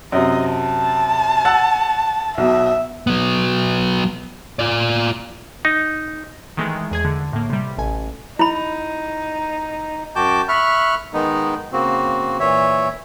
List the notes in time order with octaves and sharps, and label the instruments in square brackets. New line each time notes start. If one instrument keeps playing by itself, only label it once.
[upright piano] F#2 C3 [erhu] D#5
[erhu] A5
[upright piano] F#5 E6 A6
[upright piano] B1 B2 [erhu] E5
[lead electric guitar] F#3 B3
F4 D5
[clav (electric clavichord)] D#4
[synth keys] D#3 E3 G#3 A3 B3
E2 G#4 G#6
D3
A2 A#3
C3 G3
A1 G#5
[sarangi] D#4 [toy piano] E4 B5
[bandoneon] F#2 F#4 G5 A5 D6 G6
E5 B5 C#6 F6 F#6
D#3 G#3 B3 D#4
C#3 A#3 C4 F#4
A#2 E3 C#5 E5